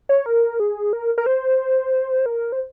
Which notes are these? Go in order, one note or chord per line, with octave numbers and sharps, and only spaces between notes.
C#5
A#4
G#4
A#4
A#4
C5
A#4
C5